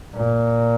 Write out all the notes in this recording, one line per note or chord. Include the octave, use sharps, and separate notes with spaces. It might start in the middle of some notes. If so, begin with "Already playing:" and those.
A#2